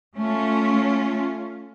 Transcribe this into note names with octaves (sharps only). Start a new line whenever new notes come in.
A3 C#4 F4